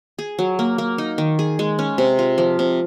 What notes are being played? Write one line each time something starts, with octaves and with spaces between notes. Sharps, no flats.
G#4
F#3
A#3
A#3
D#4
D#3
G#4
G#3
C#4
C3
F4
F3
C3